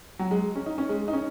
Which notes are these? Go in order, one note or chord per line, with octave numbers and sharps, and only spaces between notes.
F#3
G#3
C#4
D#4
C#4
G#3
D#4
C#4